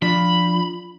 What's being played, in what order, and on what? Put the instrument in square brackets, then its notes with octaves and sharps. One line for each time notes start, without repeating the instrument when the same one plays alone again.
[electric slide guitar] F3 D4 [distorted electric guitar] B5